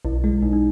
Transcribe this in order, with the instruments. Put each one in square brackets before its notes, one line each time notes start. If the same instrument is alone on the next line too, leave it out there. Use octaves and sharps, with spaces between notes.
[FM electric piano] B1 [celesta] E4
[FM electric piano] G#3 [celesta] E4
[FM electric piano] B1 [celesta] D#4
[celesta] D#4